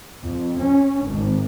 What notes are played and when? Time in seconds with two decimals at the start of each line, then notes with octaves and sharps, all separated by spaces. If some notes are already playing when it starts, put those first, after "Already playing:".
0.23 F2
0.60 C#4
1.04 G#1